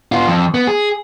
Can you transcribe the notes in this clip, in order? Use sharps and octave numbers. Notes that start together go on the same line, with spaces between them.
B3 F4
F2
B3
G#4